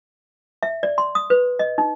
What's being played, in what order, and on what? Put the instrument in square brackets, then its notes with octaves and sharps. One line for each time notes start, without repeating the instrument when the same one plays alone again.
[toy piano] E5
D5
C6
D#6
B4
D#5
D#4